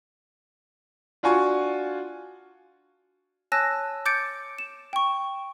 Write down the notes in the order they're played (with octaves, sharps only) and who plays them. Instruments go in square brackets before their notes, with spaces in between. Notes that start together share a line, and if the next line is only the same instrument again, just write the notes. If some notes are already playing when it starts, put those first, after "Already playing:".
[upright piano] D4 F4 F#4 G#5 C#6
[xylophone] C#5 G#5 A5 E6 F#6 A#6
D6 G6 A6 C#7 D7
E7
G5 C#6